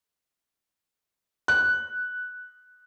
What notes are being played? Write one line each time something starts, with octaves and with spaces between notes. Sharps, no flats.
F#6